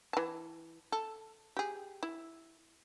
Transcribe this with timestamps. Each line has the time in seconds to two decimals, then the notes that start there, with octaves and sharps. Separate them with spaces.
0.13 E3 A5
0.92 A4
1.57 G4 G#4
2.03 E4